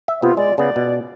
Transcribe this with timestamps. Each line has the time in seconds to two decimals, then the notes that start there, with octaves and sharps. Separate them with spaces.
0.08 E5
0.22 C3 B3 F4
0.37 G#3 D5
0.58 C#3 B3 D5
0.76 B2